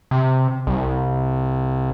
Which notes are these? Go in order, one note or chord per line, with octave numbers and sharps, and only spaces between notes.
C3
C2